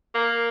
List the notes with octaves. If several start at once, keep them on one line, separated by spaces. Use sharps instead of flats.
A#3